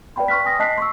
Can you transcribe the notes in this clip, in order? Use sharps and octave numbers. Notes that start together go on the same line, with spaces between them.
B4 D5 F5 G5 B5 C6
C6 C#6 F6 F#6 B6
G5 G#5 D#6 A#6
D#5 A5 F#6 B6 C7
C6 C#6 E6